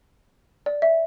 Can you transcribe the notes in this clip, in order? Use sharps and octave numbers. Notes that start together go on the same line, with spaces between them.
D5
E5